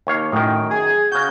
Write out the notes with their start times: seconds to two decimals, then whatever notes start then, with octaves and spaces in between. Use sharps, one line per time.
0.07 D#2 C#5 F5
0.32 F#2 A2 D#3 G5
0.71 G#4 G#6
1.12 C#3 F#4 G6